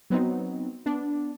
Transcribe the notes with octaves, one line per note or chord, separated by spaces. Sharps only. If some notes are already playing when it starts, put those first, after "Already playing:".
F#3 B3 C4 D#4
B3 D4